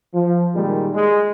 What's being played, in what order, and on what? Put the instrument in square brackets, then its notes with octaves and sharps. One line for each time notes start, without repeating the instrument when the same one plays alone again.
[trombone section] F3
A#2 D#3 G3 G#3
G#3